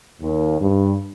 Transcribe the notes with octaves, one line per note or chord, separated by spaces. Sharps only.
D#2
G2